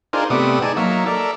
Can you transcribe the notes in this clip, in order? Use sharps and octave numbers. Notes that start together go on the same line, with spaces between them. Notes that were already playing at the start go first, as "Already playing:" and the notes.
D4 D#4 F4 G#4 A#4 C5
C3 A3 B3 D5 D#6
D#4 G#4 D5 A5
F#3 A#3 D#4 E5
A4 A#4 D5 E5